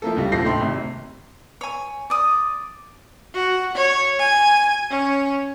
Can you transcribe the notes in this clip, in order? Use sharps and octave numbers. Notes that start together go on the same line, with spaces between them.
F3 A3 A#3 A4
C#2 G3
D#1 A#1 F3 A4 A#6 C7
A2 D#4 E5 G5 C6
G#1 C3
C#5 G#5
D5 D#6
F#4
C#5
G#5
C#4